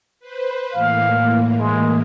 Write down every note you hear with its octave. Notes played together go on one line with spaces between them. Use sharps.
B4 C5
A2 E3 A#3 F5
G#3